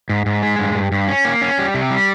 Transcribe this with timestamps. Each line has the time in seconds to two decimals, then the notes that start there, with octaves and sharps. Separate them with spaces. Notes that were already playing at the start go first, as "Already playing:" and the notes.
0.09 G#2
0.26 G#2
0.43 G#3
0.59 G2
0.75 G2
0.92 G2
1.08 C#4
1.25 A#3
1.42 C#4
1.58 G3
1.74 C3
1.90 G3